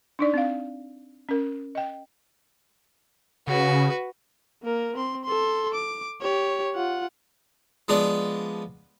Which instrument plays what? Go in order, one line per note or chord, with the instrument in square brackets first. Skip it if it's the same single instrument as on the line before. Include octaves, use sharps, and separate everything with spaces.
[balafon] D4 D#4 D5
C4 F5
C#4 A#4
D#5 G5
[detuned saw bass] C#3 [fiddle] F#4 B4
[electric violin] A#3 A#4
C4 C6
A4 C6
D6
G4 C#5
F4 F#5
[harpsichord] F3 G#3 B3 D4